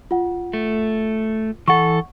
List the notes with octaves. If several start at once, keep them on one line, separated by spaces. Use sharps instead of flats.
F4 F#5
A3
E3 A4 F#5 C#6